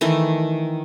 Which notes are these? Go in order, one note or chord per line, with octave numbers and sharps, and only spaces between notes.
D#3 E3 A3